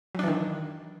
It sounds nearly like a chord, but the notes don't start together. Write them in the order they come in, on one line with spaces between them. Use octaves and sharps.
F#3 D4 E3 D#3